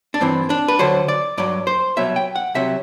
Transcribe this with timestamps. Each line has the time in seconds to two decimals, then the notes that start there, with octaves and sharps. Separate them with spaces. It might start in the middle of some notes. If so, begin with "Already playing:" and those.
0.14 D4
0.21 G2 E3 C4
0.50 D4
0.68 B4
0.79 D2 D3 F#3 C5
1.08 D5
1.38 G2 F#3 D5
1.67 C5
1.97 C2 B2 F#3 E5
2.16 G5
2.36 F#5
2.54 C2 C3 F#3 E5